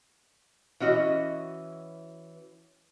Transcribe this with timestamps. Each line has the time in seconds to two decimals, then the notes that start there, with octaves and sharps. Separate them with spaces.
0.80 E3 C#4 F#4 D#5